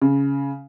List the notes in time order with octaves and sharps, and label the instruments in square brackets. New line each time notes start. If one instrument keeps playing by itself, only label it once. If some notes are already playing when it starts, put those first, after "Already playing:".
[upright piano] C#3